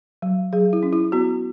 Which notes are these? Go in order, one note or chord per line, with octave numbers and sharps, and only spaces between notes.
F#3
F#3 G#4
E4
C#4
E4
B3 F#4